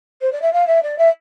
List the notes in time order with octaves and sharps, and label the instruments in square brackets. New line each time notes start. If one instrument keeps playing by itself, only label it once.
[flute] C5
D5
E5
F5
E5
D5
E5